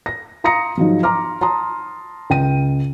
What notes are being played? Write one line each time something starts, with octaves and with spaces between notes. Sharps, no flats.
A#6
F5 A#5 C6 D#6 A#6 C#7
G#2 F3 F#3
A#5 C6 D6 F6
A5 A#5 C6 D#6
C#2 G5 D#7